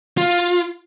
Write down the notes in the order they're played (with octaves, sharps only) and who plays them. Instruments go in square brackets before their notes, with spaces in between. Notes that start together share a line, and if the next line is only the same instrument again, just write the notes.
[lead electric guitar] F4